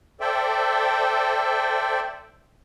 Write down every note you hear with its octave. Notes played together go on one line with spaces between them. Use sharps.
A4 C5 D5 E5 G5